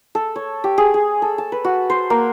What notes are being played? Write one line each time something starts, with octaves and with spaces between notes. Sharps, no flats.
A4
C#5
G4
G#4
G#4
A4
A5
B4
F#4
C5
A#3